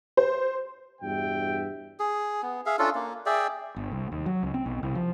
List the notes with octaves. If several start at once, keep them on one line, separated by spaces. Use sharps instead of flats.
C5
E2 G2 B2 F#4 E5 G5
G#4
B3
G#4 E5 F5
C#4 D4 F4 A4
A#3
G#4 D5 E5 G5
G1
C2
D#2
F#3
C#2
C4
B1
C2
F3